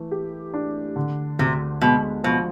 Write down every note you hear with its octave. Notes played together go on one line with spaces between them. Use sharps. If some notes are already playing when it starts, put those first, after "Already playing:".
Already playing: E3 A3
G4
D4
D3
D2 C3
B2 G#3
B2 F3